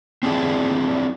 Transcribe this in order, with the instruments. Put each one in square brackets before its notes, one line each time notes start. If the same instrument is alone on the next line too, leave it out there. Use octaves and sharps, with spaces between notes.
[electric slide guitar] C4 D4 E4 G#4 D5